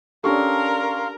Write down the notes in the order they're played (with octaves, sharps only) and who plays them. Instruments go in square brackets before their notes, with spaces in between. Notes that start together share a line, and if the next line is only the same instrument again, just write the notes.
[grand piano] C#4 C#6 [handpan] D4 G4 A4 [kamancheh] A#4 [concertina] F5 C6